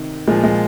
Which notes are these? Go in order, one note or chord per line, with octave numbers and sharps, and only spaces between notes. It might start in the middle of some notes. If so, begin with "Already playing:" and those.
Already playing: C3 D#3
A#2 F3 G#3
G#3